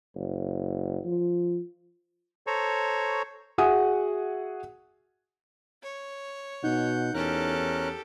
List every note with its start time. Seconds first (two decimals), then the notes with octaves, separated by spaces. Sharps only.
0.15 F#1
1.05 F3
2.47 A4 C5 C#5 A#5 C#6
3.58 F#4 G#4 E5 F#5 G#5 D#6
5.83 C#5
6.64 B2 D#4 F#5 G6
7.14 E2 C#4 G4 A4 A#4 F#6